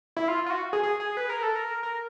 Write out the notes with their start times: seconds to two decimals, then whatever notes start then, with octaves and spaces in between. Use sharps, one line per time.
0.17 E4
0.28 F4
0.46 F4
0.50 F#4
0.73 G#4
0.83 G#4
1.00 G#4
1.17 B4
1.30 A#4
1.43 A4
1.56 A#4
1.83 A#4